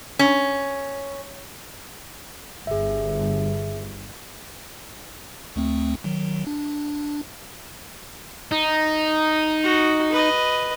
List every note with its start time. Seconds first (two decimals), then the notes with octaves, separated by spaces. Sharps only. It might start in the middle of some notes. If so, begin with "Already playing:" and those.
0.19 C#4
2.67 G1 G#4 E5
5.56 D2 A3 C4
6.04 D#3 F#3
6.47 D4
8.52 D#4
9.63 F#4
10.12 B4 D#5